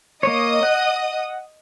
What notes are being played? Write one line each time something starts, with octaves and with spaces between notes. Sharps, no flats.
A#3 C#5 D#5 D#6
F#5